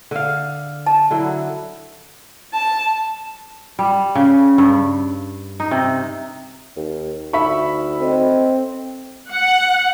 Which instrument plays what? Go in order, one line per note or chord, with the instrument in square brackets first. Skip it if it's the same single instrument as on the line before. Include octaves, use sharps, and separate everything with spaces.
[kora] D3 F5
[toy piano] A5
[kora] D3 F#3 E4
[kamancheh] A5
[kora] G3
C#3
G2
D#4
C3
[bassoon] D#2
[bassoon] D2 [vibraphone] D#4 [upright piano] E5 B5 C#6
[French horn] C4 [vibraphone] A4 D#5
[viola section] F#5